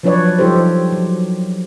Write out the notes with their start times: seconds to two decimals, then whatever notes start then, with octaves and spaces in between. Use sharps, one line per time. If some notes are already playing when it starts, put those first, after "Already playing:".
0.03 F3 F#3 D4 B4 C#5 D5
0.39 F3 G3 D#4 G4 A4 C5
0.92 F#3